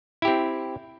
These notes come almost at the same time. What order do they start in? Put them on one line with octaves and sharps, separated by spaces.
E4 G4 C4